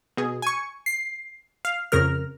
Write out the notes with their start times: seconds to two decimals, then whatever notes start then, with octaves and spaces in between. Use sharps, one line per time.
0.17 B2 G#4
0.42 G#5 C#6
0.86 C7
1.65 F5
1.92 F2 C#3 A#4 F6